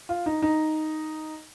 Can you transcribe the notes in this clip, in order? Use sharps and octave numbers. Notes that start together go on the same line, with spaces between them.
F4
D#4
D#4